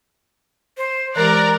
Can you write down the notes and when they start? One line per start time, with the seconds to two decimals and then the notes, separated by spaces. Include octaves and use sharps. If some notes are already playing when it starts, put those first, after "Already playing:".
0.78 C5
1.16 E3 G#3 G4 A#4 D5 A#5 F#6